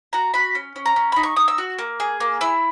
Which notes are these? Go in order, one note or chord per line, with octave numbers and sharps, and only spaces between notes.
F#4 A#5
F#4 B5
C#4
C#4
A#5
C#4
D#4 B5
C#6
D#4 D#6
E6
F#4
A#3
G#4
A#3
E4 E6